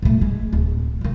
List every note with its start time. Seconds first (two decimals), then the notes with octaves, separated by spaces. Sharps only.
0.02 A#2 A3
0.21 G#3
0.53 D1
1.01 C#2 D#3